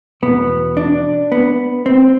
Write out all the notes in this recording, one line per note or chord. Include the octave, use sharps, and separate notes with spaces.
E2 B2 B3
D4
B3
C4